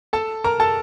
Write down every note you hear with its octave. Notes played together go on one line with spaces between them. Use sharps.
A4 A5
A#4 A#5
A4 A5